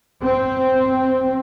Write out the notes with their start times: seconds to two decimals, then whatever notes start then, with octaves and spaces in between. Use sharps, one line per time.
0.23 C4